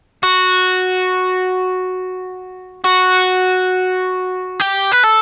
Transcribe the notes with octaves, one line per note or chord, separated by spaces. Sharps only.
F#4
F#4
G4
B4
A4